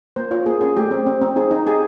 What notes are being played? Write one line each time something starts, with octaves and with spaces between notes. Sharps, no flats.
A#3 C5
F4 C#5
A#3 G#4
C#4 G#4
A3 G4
C4
C4
C4
D#4 G#4
D#4
G4 G#4